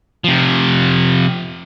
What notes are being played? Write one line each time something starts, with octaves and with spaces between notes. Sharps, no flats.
C3 F3